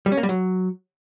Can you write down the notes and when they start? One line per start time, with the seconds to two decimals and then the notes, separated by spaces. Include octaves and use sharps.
0.06 G3
0.12 C#4
0.17 A#3
0.23 G3
0.29 F#3